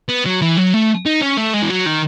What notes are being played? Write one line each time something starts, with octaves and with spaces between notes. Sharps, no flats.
B3
F#3
E3
F#3
A3
D#4
C#4
A3
G#3
E3
F#3
D#3